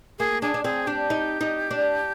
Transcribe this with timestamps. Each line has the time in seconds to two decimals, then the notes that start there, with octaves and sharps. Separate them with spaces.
0.19 A#3 G#4
0.42 D4 G#4
0.54 D4
0.64 C4 G#4
0.87 D4 G4
1.10 D#4
1.41 D#4
1.71 D4